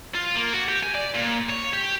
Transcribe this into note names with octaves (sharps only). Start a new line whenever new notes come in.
F4
A#3
F#4
G4
G#5
D5
A#2
C#5
G4